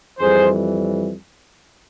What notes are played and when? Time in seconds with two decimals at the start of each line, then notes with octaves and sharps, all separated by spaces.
0.19 F2 E3 G3 G#4 C5